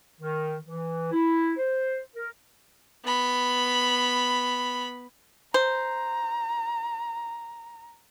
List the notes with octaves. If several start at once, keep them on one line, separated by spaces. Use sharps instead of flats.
D#3
E3
E4
C5
A#4
B3 B5
C5 A#5